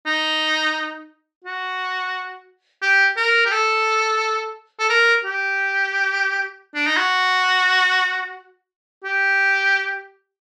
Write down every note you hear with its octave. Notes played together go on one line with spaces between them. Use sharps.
D#4
F#4
G4
A#4
G4
A4
A4
A#4
G4
D4
D#4
F#4
G4